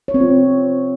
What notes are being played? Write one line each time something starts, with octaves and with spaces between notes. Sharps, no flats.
C#5
C4
F4